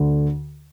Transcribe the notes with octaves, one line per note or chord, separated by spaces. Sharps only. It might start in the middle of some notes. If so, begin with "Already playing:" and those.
Already playing: D2 D3